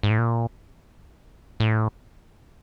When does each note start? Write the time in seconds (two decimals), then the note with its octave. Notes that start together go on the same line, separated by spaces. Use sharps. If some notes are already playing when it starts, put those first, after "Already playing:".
0.03 G#2
0.10 A2
0.18 A#2
1.60 A2